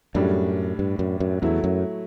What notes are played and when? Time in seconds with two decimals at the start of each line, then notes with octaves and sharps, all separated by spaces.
0.14 F#2 A2 G3 D4
0.79 G2
0.99 F#2
1.20 F#2
1.42 E2 F#3 A3 E4
1.64 F#2